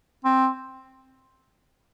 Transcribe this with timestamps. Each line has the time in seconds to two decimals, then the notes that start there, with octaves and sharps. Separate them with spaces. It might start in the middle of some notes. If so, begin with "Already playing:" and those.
0.24 C4